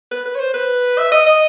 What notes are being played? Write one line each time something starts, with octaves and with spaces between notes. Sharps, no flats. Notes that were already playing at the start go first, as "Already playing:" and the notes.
B4
B4
C#5
C5
B4
E5
D#5
D#5